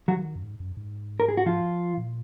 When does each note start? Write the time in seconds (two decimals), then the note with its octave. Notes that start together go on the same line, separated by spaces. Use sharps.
0.08 F#3 F#4
0.17 D#3
0.36 F#2
0.43 G#2
0.60 F#2
0.77 G#2
1.20 A#4
1.28 G#4
1.37 F#4
1.46 F3 F4
1.98 A#2